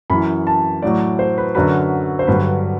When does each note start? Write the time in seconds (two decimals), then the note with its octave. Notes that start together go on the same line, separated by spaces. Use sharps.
0.10 F#2 E3 B5
0.47 A5
0.82 A2 F#3 D5
1.19 C5
1.38 B4
1.55 F#2 D3 F#3 B4
2.19 C5
2.27 G2 D3 F#3 B4